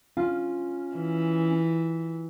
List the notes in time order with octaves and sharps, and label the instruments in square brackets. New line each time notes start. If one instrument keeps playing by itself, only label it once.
[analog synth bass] C#4 [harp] F4
[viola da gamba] E3